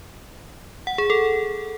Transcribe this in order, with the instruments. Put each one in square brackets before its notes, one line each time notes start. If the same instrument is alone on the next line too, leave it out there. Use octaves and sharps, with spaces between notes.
[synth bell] F#5
G#4
A4